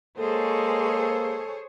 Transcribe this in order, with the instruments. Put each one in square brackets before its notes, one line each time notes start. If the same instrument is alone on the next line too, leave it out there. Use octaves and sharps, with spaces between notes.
[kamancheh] G#3 [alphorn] A#3 [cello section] G#4 C5 C#5 [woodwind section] A4